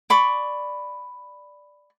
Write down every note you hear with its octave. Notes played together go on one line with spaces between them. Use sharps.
D5 B5 C#6